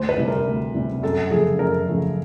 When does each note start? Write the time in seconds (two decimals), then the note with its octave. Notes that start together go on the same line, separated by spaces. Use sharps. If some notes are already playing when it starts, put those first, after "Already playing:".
Already playing: D2 C5
0.09 B4
0.18 C3 E3 G3
0.28 A#4
0.47 D2
0.74 C3 E3 G3
1.03 F#2 A4
1.31 C#3 F3 A3 G#4
1.59 F#2 A#4
1.88 C#3 F3 A3